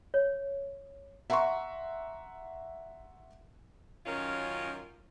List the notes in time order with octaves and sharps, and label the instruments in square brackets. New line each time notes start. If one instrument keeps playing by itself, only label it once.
[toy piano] C#5
[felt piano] E5 F#5 A#5 C6 C#6
[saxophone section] F#2 D#3 C#4 F4 A#4